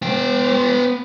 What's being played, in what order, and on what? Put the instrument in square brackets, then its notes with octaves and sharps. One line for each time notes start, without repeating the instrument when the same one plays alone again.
[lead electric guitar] B3 G5